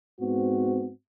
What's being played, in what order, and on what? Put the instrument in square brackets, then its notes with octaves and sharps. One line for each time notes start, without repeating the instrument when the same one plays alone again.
[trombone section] G#2 B3 C4 F#4